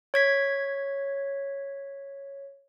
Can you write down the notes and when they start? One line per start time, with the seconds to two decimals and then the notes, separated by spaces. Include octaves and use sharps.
0.14 C#5 G#6 B6